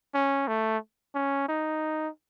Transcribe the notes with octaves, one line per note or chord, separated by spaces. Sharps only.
C#4
A3
C#4
D#4